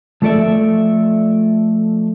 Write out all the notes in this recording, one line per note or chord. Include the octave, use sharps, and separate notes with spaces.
F3 A3 A4 D5 E5